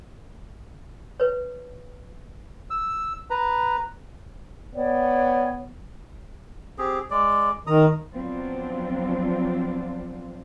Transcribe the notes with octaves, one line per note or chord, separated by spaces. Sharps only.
B4 C#5
E6
B4 A#5
B3 C#5 D5 G5
C4 G4 G#4
G#3 D5
D#3 A#5 D#6
F3 F#3 B3 C4 D4 F4